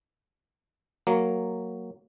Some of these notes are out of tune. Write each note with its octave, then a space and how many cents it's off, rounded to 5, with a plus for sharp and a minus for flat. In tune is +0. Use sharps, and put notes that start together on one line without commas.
F#3 +0 A#3 -10